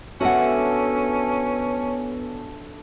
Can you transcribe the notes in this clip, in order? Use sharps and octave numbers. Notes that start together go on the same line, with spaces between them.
B3 C#4 D4 F#4 A4 E5 F#5